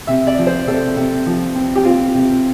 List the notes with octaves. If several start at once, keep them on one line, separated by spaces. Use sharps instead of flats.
C3 E5
D5
F3
C5
C3 A4
C3
F3
C4
G4
C4 F4
C3